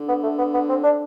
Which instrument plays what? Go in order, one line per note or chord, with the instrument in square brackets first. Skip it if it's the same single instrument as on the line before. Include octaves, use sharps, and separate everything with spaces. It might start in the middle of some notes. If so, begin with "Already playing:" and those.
Already playing: [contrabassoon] D3
[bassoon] B3
A3
B3
B3
C4
D4